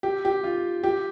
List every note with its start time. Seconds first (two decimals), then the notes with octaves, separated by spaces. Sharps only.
0.03 G4
0.25 G4
0.44 F4
0.84 G4